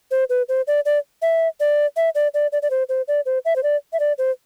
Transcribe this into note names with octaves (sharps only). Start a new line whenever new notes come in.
C5
B4
C5
D5
D5
E5
D5
E5
D5
D5
D5
D5
C5
C5
D5
C5
E5
C5
D5
E5
D5
C5